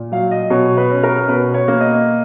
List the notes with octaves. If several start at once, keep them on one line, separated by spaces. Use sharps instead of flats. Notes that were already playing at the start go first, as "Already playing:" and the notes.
Already playing: A#2
F#3 F5
D#5
B2 C#5
B4
C#4
A#4
B2 B4
C#5
A#3
D#5